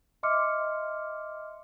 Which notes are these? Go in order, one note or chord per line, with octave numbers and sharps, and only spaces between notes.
D#5 E5 C6 D6 F6 C#7